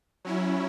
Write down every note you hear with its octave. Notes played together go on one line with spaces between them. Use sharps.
F#3 C#4 E4